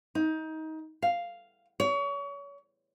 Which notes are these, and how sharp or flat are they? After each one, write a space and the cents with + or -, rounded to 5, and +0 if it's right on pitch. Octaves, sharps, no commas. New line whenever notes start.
D#4 +25
F5 -5
C#5 +30